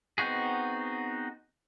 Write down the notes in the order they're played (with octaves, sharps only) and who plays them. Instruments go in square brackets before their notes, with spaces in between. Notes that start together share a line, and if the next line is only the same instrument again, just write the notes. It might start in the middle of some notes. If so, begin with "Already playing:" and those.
[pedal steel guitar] B3 C4 D#4 F#4 G#4